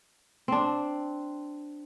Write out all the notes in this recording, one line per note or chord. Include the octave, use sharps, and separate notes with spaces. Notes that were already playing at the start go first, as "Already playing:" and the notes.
C4 D4